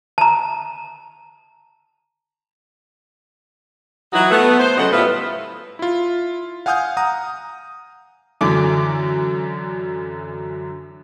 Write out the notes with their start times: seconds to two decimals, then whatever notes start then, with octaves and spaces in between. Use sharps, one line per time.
0.18 A5 A#5
4.13 E3 F#3 D#4 E4 F#4
4.31 A3 B3
4.60 C5
4.77 C#3 F#3 F#4 A4 D#5 F#5
4.92 A2 G3 B3 F4 B4 E5
5.79 E4 F4
6.66 F5 F#5 G#5 D#6 F6 G6
6.97 F#5 A#5 D#6
8.41 F#2 D3 E3 D6